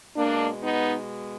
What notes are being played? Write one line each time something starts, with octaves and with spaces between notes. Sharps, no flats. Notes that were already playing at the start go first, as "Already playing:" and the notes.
B2 G#3 A#3 D4
B3 D#4